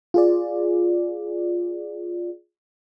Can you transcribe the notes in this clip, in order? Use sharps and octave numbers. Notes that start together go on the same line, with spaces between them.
F4 G#4 D5